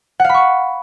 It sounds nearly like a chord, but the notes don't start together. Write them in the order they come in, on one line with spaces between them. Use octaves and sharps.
F#5 F5 B5 C#6